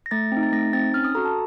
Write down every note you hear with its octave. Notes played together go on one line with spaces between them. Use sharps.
A#6
A3 A6
C4 D#4
A6
A3 A#6
C4 D#4 A6
C#4 F6
D#6
F#4 A4 A#5
A5